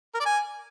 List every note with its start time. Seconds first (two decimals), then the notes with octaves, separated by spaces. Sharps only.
0.14 A#4
0.20 D5
0.26 G#5